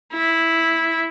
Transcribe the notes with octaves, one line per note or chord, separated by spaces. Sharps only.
E4